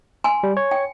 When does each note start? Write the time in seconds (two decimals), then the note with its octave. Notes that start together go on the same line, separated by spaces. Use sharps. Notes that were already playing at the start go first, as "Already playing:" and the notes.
0.24 G#5 C6
0.43 G3
0.57 C#5
0.71 G5